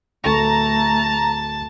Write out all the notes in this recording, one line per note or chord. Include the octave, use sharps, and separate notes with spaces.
D1 A3 A4 A5 A#5 C#6